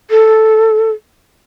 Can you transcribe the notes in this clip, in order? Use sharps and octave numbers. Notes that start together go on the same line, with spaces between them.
A4